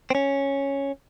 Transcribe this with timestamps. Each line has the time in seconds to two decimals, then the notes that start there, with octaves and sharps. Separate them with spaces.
0.10 C4
0.15 C#4